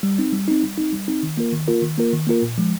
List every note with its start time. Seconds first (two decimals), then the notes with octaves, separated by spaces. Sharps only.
0.03 G3
0.18 C4 D#4
0.33 G3
0.48 C4 D#4
0.63 G3
0.78 C4 D#4
0.93 G3
1.08 C4 D#4
1.23 D#3
1.37 A#3 F4 A#4
1.53 D#3
1.68 A#3 F4 A#4
1.82 D#3
1.98 A#3 F4 A#4
2.13 D#3
2.27 A#3 F4 A#4
2.42 A#2
2.58 F3 G#3